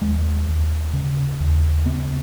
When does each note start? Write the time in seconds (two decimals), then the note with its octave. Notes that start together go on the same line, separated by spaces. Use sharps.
0.02 D#2 G#3
0.48 D#2
0.93 C#3
1.40 D#2
1.86 C#3 B3